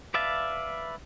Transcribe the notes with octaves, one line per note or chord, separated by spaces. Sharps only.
B4 D5 E5 F5 A5